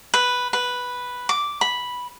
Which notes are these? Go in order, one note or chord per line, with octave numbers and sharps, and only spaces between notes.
B4
B4
D6
B5